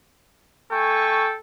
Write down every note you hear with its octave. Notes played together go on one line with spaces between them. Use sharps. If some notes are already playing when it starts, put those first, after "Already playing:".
A3 A4 G5 G#5 C#6